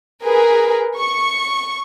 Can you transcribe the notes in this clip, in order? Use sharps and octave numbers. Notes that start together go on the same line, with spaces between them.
G#4 A#4 B4
C#6